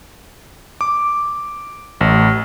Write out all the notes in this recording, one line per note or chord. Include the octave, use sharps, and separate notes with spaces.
D6
A1